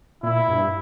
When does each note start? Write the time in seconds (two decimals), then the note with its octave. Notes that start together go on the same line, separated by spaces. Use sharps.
0.23 A#2 E4
0.49 G2